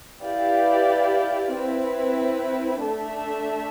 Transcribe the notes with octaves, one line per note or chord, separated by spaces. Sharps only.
E4 G4 B4 D5 F5
C4 E4 B4
A3 D4 A4 E5